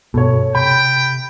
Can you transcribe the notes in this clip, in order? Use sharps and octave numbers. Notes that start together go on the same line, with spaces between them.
G2 B2 A4 C#5
C3 G5 B5